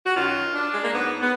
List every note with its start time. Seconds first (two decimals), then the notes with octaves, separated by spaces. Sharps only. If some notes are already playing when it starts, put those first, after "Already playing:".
0.06 F#4
0.15 F#2 D#3 F#3 F4
0.53 D4
0.73 G#3
0.83 A#3
0.92 G#2 F#3 B3
1.21 B3